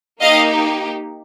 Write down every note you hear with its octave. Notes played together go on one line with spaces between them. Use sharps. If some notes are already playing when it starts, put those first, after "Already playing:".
A#3 D#4 G4 D#5 F5